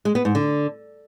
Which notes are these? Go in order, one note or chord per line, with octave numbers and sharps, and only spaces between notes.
G#3
B3
G#2
D3